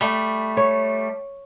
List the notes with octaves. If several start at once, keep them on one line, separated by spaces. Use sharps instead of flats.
G3 A3
C#5